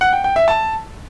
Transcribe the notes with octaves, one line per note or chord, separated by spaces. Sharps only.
F#5
G5
G5
E5
A5